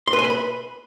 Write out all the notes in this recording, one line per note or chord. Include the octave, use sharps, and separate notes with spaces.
C6
B4
G#5
B4
B5